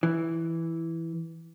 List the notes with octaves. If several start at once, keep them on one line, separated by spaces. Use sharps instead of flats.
E3